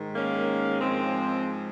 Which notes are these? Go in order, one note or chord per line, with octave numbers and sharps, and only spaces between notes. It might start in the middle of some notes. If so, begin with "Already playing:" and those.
Already playing: G#2 D#3
A#3 C#4
G#2 F3 G#3 C4